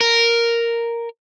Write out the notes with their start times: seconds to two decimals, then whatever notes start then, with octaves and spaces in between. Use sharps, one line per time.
0.01 A#4